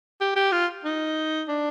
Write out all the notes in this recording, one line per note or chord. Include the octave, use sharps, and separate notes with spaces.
G4
G4
F4
D#4
D4